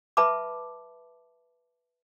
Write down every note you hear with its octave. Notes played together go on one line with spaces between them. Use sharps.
B4 E5 A5 B5 D6